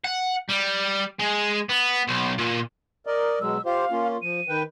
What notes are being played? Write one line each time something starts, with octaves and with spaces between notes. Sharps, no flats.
F#5
G3
G#3
B3
B1
A#2
A#4 D5 D#5
B2 F#3 G#3 E6
F4 G4 C5 F5
A#3 C#4 F4
F3 D#7
D#3 B4 G5